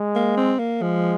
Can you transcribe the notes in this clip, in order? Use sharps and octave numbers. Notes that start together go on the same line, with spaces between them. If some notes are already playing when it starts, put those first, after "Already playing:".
Already playing: G#3
A#3
C4
A#3
F3 G#3